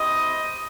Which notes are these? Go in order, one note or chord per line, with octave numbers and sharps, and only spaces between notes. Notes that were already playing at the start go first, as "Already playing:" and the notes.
Already playing: C4 E4 G4 D#5